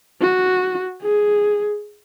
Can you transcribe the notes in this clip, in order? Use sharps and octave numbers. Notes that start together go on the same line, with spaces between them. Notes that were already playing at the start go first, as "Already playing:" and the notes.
F#4
G#4